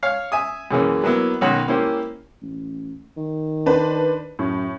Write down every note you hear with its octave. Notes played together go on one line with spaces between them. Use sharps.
C#5 F5
E5 G#5 D#6
F#2 C#3 E3 A#3 C#4
F#3 A#3 B3 E4
B1 D#3 C#4 F#4 C#5 B5
A#3 C#4 E4 G4 C5
A1
D#3
D4 B4 C5
F#2 A2